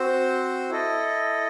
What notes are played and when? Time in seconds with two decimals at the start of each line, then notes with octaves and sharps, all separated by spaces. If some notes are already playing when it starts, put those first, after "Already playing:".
Already playing: C4 F#4 C5
0.70 E4 A4 D#5